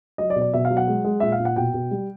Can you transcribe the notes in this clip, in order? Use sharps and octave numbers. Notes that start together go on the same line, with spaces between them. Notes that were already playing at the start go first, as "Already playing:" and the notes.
F#3 D#5
D5
B2
D5
B2 E5
F5
F#3
F#5
G#3
G#3
A#2 E5
F5
A#2
F#5
B2 G5
B2
G3